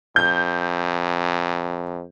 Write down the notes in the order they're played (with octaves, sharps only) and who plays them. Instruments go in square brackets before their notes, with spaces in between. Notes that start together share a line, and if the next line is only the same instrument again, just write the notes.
[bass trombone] F2 [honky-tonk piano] G6